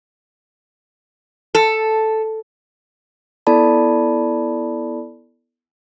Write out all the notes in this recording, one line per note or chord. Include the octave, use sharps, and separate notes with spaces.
A4
B3 E4 A4 D5 A5 B5